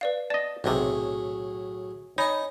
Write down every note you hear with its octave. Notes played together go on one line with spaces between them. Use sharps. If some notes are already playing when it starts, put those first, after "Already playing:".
B4 D5 F5
D5 D#5 A5
B1 A2 C3 F#3 G#4
D#4 C#5 D#5 G#5 B5